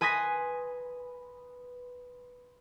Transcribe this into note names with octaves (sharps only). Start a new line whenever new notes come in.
B4 G#5 C6 D#6 A#6 B6